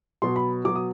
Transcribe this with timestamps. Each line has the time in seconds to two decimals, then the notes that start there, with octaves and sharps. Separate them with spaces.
0.22 B2 F#3 C6
0.36 B5
0.65 B2 F#3 D6
0.76 D#6